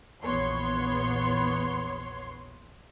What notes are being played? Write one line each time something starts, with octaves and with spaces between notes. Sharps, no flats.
A#1 E2 B3 C#5 C6